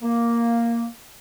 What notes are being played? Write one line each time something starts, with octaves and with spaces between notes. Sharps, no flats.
A#3